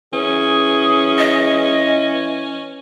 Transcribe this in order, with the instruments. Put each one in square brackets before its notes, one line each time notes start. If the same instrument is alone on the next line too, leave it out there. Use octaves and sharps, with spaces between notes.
[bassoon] E3 [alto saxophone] C#4 [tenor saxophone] G#4
[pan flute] D#5